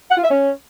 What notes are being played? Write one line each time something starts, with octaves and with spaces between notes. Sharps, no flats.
F#5
F4
E5
C#4